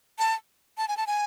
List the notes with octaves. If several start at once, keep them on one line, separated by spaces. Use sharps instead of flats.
A5
A5
G#5
A5
G#5